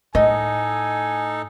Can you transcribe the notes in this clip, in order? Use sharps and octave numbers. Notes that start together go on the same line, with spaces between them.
A2 D#4 A4 D#5 G#5